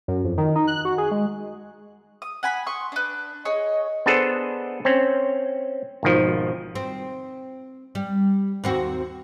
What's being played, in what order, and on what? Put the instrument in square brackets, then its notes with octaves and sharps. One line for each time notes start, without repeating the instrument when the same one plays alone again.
[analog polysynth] F#2
F2
D#3
D#4
F#6
F#4
G#4
G#3
[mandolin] D#6
F#5 G#5 B5
C6 C#6 D#6
D4 B4
[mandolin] G#4 C#5 [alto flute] D#5
[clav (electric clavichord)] B3 D4 G#4 A4 C5
C4 C#4
G#1 B2 D#3 F3
[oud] C4
G3
D#2 C4 F#4